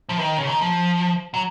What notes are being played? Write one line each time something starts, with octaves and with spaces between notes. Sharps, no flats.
F3
D#3
C#3
D#3
F3
F#3